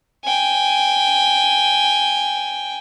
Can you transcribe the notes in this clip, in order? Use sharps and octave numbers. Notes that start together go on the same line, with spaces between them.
G5 G#5